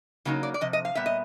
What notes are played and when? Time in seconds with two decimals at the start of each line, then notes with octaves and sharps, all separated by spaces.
0.25 C#3 F#3 A#3 D#4 C#5
0.43 D5
0.54 D5
0.61 C3 F3 D#5
0.73 D#5
0.85 F5
0.95 A#2 G3 B3 E5
1.06 D#5